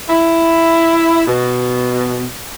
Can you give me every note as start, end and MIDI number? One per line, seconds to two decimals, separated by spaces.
0.09 1.23 64
1.27 2.26 47